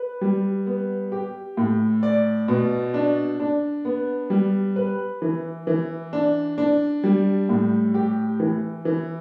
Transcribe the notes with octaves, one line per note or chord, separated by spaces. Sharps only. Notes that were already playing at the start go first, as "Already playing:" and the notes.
Already playing: B4
G3
B3
G4
A2
D5
B2
D4
D4
B3
G3
B4
E3
E3
D4
D4
G3
A2
G4
E3
E3